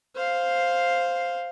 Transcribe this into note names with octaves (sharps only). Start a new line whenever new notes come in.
C5 F5